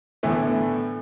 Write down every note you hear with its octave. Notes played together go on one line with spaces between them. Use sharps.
A2 D3 E3 A3 B3